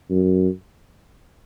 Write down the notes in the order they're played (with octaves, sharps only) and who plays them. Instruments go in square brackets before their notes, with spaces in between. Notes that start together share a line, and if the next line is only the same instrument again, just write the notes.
[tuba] F#2